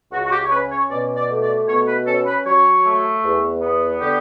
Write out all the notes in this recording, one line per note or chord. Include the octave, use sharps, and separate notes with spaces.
C#2 F#4
F#4
G4
C#5
C#4 B4
C#5
B2 D5
D5
A3
D5
B2 C#5
B4
C#4 A4
B4
F#3 C#5
A3
E2
B3
D3 G4